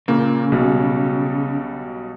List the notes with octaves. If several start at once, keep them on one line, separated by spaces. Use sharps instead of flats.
A#2 C#3 A#3
B1 B2 G3